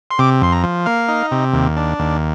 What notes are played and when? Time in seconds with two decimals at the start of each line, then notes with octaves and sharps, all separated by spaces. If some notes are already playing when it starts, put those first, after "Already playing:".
0.11 C6
0.19 C3 D6
0.41 F2 C6
0.52 A#5
0.64 F3
0.86 A#3 F5
1.08 D#4
1.31 C3
1.53 D#2
1.77 D4
1.99 D#2